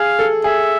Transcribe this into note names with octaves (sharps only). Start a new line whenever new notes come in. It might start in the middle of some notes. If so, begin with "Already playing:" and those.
Already playing: G#4 F5
A4
G#4 E5